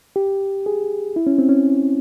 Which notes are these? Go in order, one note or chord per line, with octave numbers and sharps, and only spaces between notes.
G4
G#4
E4
C#4
C4
C#4